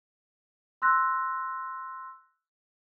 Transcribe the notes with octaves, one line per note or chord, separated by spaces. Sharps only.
C6 E6 F#6 A#6